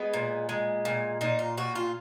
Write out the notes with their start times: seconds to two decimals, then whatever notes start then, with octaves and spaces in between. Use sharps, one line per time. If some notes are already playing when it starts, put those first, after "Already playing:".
Already playing: G#3 B3
0.13 A#2
0.49 G#3
0.85 A#2
1.21 A#2 D#4
1.39 F4
1.57 A#2 F#4
1.75 F4